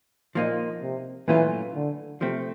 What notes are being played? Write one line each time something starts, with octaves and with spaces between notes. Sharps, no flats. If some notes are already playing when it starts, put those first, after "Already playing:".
A#2 F3 A#3 D#4
C3
A#2 E3 F#3 A3 C#4 F4
D3
C3 F3 A3 C4